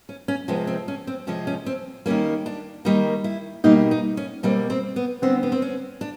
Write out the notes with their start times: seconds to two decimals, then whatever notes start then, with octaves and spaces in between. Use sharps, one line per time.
0.09 C#4
0.28 C#4
0.48 C3 F3 G#3 B3
0.67 C4
0.88 C#4
1.07 C4
1.27 C3 F3 G#3 C#4
1.47 C#4
1.66 C4
2.06 D#3 G3 A#3 C#4
2.46 D4
2.85 D#3 G3 A#3 D#4
3.24 E4
3.64 B2 G3 A#3 D#4
3.91 D#4
4.17 C#4
4.43 B2 G3 A#3 C4
4.70 C4
4.96 B3
5.22 D3 G3 B3 C4
5.43 B3
5.52 C4
5.62 C#4
6.01 D4